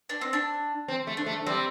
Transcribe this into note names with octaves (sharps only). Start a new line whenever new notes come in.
D4
C4
D4
C4
A3
D4
A3
G3 C4